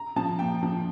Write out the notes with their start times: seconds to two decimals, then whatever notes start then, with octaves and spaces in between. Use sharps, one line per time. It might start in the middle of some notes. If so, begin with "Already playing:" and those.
Already playing: A#5
0.16 F3 A5
0.39 A#2 G5
0.63 F3